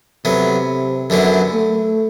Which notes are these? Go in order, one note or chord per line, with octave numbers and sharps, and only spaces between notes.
A2 C3 F#3 B3
F#2 D3 F#3 B3 E4
A3